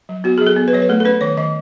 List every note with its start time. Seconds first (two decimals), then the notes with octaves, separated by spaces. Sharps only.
0.09 F#3
0.24 B3 F#4
0.38 G#4
0.41 F#3
0.47 A4
0.56 B3
0.68 B4
0.73 F#3 C#5
0.82 B4
0.89 A3 A4
1.00 A4
1.05 C#4 B4
1.21 D#3 C#5
1.37 D#3 D#5